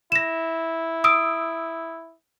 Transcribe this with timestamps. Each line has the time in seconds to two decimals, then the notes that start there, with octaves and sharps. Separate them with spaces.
0.12 E4 A#6 E7
1.04 D#6 E6 D7